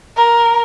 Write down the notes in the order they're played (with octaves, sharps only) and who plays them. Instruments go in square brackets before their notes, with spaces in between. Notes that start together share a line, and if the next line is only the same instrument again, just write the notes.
[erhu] A#4